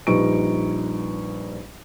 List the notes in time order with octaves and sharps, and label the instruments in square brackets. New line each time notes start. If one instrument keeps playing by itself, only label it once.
[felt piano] A#1 G3 D#4 B4 C#6 D7